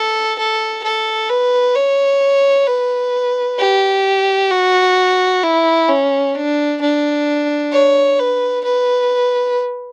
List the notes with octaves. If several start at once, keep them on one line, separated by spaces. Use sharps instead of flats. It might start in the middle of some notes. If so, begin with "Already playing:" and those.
Already playing: A4
A4
A4
B4
C#5
B4
G4
F#4
E4
C#4
D4
D4
C#5
B4
B4